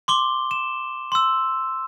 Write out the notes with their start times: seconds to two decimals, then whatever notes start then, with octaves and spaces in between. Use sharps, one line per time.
0.08 C6 D6 G7
0.51 E7
1.12 C6 E6